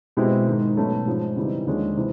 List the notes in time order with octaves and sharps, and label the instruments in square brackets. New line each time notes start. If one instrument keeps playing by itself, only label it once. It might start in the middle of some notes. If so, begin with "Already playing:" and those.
[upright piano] B2 G#3 C4 E4 G4
G#2 D#3 G#3
B2 F#3 A3 C#4
G#2 F3 G#3 C#4
C#3 E3 G3 C4 D#4
D#2 D3 F3 G#3 C#4
C3 E3